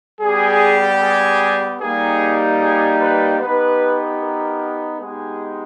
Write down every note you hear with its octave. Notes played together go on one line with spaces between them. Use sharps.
G3 B3 G4 G#4
G#4
G3 A#3 D#4 G4 G#4
G#4
B4
B3 D#4 G4 B4
A#4
G#3 B3 D#4 G4 G#4